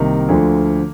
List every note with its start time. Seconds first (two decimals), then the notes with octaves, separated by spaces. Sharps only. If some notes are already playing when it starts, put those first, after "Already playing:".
Already playing: C2 C3 D#3 A#3
0.29 D2 D3 F3